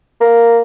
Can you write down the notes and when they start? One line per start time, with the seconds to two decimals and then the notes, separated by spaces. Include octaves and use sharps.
0.21 A#3